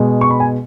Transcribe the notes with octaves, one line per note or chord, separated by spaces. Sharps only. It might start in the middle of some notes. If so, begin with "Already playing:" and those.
Already playing: B2 G#3
C#6
B5
G#5